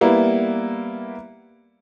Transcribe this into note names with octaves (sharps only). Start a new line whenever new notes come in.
G3 A#3 B3 E4